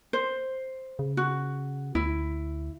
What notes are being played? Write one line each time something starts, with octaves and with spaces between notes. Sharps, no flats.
C5
C#3
F#4
D2 E4